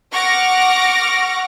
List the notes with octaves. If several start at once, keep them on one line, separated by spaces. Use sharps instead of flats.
F#5 C#6 D6 F6 A#6